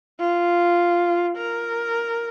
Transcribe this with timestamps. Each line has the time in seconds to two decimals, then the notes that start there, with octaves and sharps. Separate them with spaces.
0.20 F4
1.37 A#4